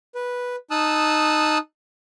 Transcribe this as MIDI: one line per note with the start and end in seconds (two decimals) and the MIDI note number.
0.15 0.56 71
0.71 1.58 63
0.71 1.58 81
0.71 1.58 87
0.71 1.58 88
0.71 1.58 90